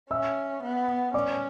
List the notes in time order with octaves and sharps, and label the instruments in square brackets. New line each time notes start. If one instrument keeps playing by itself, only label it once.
[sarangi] C#4 [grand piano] E5 E6
[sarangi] B3
[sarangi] C#4 [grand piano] D5 D6